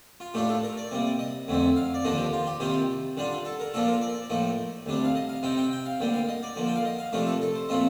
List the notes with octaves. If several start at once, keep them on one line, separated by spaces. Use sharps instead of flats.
F4
A2 A3 D4 F4 G4
A4
A#4
D5
C3 G3 A#3
D#5
F2 D3 A3 C4
F5
D5
D#2 D3 F3 A#3 D4 D#5
G4
F4
G4
C3 D#3 G3 A#3 F4 G4
D3 G3 D4 F4
A4
A#4
A#2 F3 A#3 D4 F4 A4
A#4
D5
A2 F3 A#3 D#4
D2 C3 G3 D4
F5
D#5
F5
C3 G3 C4 D#4 G5
G5
G5
F5
D2 D3 G3 A#3 G5
F5
D#5
D5
D3 F3 A#3
G5
F5
D#5
F5
C3 F3 A3 D4 A#4
A4
A4
C5
A#2 F3 A3 C4 F4 D#5